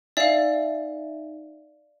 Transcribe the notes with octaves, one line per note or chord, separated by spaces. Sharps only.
D#4 D5 E5 F5